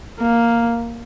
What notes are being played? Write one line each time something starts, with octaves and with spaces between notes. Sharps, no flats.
A#3